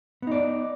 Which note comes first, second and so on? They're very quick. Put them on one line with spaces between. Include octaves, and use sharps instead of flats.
B3 D#4 D5